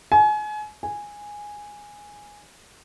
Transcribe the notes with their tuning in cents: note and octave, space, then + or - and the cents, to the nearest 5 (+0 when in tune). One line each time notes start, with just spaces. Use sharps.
G#5 +35
G#5 -5